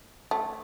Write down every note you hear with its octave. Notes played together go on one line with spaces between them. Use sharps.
A3